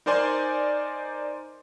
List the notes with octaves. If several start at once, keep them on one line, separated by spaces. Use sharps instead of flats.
D#4 A#4 C5 D5 G#5 C6